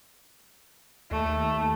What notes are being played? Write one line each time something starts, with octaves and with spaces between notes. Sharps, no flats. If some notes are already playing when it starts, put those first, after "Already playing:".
D#2 A3